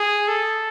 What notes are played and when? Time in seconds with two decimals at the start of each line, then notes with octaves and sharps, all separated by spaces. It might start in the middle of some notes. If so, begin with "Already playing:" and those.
Already playing: G#4
0.28 A4